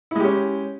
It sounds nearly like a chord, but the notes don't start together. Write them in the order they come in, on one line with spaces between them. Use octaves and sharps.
E4 G#3 G4 C#4